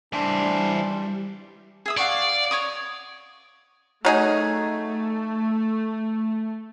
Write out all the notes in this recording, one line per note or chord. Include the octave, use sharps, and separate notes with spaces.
E3 G3 D4 C5
G#4 E5 D#6
D5 F5 F#5 C#6
C#5 C#6 D#6
F#3 A3 D#4 G#4